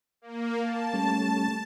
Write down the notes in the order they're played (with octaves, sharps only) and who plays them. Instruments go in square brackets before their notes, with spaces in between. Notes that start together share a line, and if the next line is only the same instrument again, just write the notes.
[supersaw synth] A#3
A5
[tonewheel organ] G3 A3 C#4